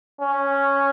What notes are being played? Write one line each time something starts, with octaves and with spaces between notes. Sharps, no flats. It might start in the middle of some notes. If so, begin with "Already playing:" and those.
C#4